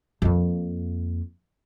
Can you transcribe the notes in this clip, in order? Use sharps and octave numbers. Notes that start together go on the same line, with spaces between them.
F2 A#3